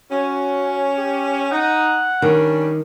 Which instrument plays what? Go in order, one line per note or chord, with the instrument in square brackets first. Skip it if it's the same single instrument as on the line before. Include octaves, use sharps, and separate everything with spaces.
[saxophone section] C#4 [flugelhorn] F#4
[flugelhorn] G4
[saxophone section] D#4 [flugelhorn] F#5
[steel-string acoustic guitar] D#3 [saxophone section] G3 C#4 D4